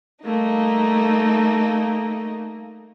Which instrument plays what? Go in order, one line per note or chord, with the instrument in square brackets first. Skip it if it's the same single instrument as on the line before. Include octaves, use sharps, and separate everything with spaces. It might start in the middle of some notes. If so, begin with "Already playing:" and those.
[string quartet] G3 A3 A#3 D#4